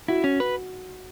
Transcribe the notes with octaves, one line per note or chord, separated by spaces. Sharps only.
E4 F#4
C#4
B4